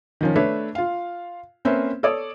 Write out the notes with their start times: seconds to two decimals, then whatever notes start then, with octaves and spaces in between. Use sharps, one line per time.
0.21 D#3 F3 C#4
0.36 A3 D4 B4 C#5 E5
0.75 F4 F5
1.65 A#3 C4 C#4 B4 C5 E5
2.03 A4 C#5 D5 D#6